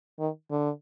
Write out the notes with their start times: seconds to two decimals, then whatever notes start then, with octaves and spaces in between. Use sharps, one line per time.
0.19 D#3
0.51 D3